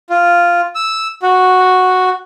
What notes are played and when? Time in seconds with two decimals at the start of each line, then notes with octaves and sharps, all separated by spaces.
0.10 F4
0.75 E6
1.23 F#4